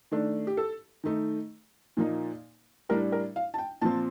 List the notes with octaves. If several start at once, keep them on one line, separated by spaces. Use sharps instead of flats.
D#3 A3 D4
G4
A4
D#3 A3 D#4
A#2 F3 A#3 D#4
A2 G3 D4 A#4
A#4
F5
A5
G5
A#2 F3 C4 A5